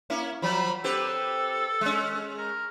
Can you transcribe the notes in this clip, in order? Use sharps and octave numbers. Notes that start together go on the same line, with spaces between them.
A#3 C#4 E4
F3 F#3 B5
C4 G4 A4 B4
G#3 C#4
A#4